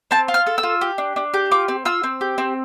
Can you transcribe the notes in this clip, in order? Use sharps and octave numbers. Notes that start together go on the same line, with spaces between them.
C4 A5
F4
F6
A4
E6
F4
G4
D4
D4
G4
F4 D6
C4
F4 E6
C4
G4
C4